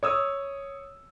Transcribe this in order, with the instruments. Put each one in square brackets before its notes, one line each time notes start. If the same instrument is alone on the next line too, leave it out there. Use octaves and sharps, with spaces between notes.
[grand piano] C#5 D#6 E6